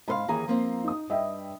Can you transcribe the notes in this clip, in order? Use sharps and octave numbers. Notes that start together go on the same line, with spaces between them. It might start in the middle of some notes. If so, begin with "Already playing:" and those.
G#2 A#4 F5 B5 C6
D#2 E3 G#4 A#5
F3 A#3 C4
D#4 D#6
G2 D#5 E5 G5